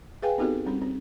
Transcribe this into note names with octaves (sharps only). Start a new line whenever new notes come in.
G#4 B4 F5 G5 G#5
B3 C4 D#4 F#4 G4 A4
G3 C4 C#4
C4